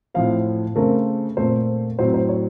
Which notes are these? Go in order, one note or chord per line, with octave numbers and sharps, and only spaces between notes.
A2 F3 C4 F5
C#3 A3 C4 A#4
A#2 A3 C4 C5
A2 F#3 C4 C5
C5
C#5